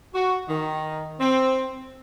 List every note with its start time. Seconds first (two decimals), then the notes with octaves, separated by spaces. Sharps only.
0.15 F#4
0.49 D#3
1.20 C4